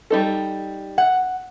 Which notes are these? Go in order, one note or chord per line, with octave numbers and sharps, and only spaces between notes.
G3 D#4 A4
F#5